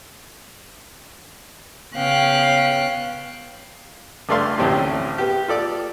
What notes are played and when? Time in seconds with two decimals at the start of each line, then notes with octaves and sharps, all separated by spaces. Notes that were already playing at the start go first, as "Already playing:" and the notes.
1.96 C#3 B3 C#4 F5 G5 F#6
4.29 C#2 G2 A3 D5 F5 C6
4.58 A1 D2 A2 C4 C#4 G4
5.18 B3 G4
5.48 F4 A4 D5 D6